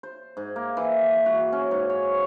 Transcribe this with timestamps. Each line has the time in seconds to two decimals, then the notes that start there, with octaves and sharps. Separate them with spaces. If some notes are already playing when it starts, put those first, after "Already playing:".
0.03 C5
0.37 G#2
0.56 A#3
0.77 E3
1.26 F#4
1.52 C#4
1.71 G#2
1.90 C#5